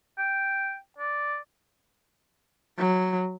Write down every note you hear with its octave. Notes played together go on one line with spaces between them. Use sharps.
G5
D5
F#3